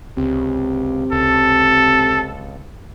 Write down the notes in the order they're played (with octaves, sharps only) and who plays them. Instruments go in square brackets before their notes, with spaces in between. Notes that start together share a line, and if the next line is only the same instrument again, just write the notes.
[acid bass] C#2 [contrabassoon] C3
[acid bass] C#2 [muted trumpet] A4